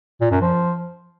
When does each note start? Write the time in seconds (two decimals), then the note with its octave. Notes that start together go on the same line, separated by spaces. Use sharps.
0.21 A#2
0.31 F#2
0.41 F3